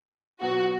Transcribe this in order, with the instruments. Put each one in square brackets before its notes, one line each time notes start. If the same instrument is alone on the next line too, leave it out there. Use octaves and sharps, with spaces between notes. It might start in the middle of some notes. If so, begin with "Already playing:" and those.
[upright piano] B2 F#3 B3 [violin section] F#4